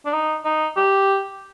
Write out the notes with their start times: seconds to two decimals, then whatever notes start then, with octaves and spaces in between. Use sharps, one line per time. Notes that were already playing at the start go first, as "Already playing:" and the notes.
0.06 D4
0.13 D#4
0.45 D#4
0.77 G4